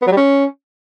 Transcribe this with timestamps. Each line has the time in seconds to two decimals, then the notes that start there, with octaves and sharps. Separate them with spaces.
0.02 B3
0.07 F#3
0.12 G3
0.17 C#4